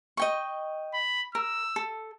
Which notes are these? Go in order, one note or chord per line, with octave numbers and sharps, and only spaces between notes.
D#5 G5 C#6
B5
A#4 E6
A4